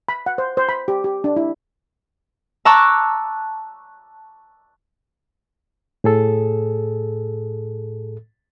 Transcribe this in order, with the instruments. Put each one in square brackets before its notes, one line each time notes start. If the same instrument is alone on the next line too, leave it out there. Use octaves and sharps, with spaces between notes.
[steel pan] B5
F#5
C5
C5
B5
G4
G4
D4
E4
[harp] A5 A#5 C#6 D6 E6 F#6
[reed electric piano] A2 G#4 A4